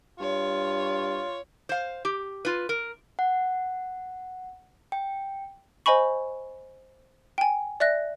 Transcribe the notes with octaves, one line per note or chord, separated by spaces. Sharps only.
G2 F4 C#5
C5 F5
G4
F4 B4
A#4
F#5
G5
C5 D#5 G#5 B5 C#6
G5 G#5
D5 E5 F#6 A#6